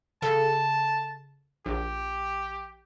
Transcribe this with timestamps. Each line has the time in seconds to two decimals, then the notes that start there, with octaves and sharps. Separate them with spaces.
0.22 C#3 A4 A5
1.66 A#1 G4